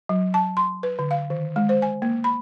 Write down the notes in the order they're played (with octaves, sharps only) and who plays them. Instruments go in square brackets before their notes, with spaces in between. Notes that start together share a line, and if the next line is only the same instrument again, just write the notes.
[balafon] F#3
A5
C6
B4
D3
F5
D#3
G#3
C5
G#5
A#3
B5